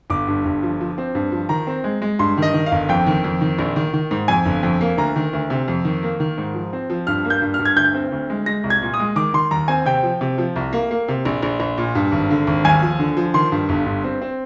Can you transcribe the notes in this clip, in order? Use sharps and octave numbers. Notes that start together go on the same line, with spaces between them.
G1 D6
G2
G1
F3
F3
C4
G2
F3
D#3 A#5
C4
G#3
G#3
G2 C6
D#3 D#5
D#3
F5
G1
F2 G5
D#3
F2
D#3
A#1
D#3
D#3
G#2
F2 G#5
G1
F2
A#3
D2 A#5
D#3
D2
C3
F2
D#3
A#3
D#3
G#2
F3
C4
F3
G2 F6
A#3
G6
G2
F6
G2
G#6
D2 G6
C4
D2
G#3
G#3 A#6
C2
G#6
A#2
D#6
G#3
D#3 D6
D#3 C6
D#2 A#5
C4 G#5
C3 G5
F3
C3
F3
C2
A#3
A#3
C3
A#1
A#1
A#1
A#2
G2
G#1
D3
G#1
D#2 G#5
F3
D3
F3
D#3 C6
G2
G1
G2
C4
C4